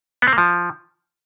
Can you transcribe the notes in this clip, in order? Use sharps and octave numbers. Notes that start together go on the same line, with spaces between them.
B3
C4
A#3
F3